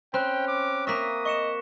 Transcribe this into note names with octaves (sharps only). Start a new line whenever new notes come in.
C4 C#4 G5 B5 F#6
D6
A#3 E5 C#6 D#6 A#6 B6
D#5 C#6 C#7 E7